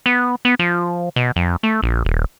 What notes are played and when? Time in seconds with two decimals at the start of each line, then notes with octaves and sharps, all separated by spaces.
0.06 B3
0.45 B3
0.59 F3
1.16 B2
1.36 F2
1.63 A3
1.82 A#1
2.05 D#1